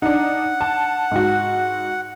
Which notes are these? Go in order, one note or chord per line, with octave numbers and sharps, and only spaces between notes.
D4 D#4 F#5
A5
G#2 F#4